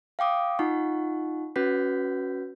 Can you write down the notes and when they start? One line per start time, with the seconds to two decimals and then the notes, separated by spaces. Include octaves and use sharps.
0.19 F5 G5 D6 D#6
0.59 D#4 F4 F#5 C#6
1.56 C#4 F#4 B4 G6 B6